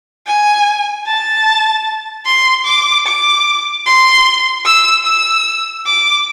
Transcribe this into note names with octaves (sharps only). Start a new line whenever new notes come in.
G#5
A5
C6
D6
D6
C6
E6
E6
D6